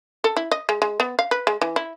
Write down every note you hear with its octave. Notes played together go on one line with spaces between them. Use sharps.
A4
E4
D#5
G#3
G#3
B3
F5
B4
G#3
E3
E4